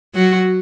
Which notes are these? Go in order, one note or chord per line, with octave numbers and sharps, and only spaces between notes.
F#3 F#4